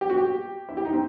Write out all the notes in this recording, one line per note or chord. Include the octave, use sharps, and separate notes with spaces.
G4
F#4
G4
E4
G4
D#4
C4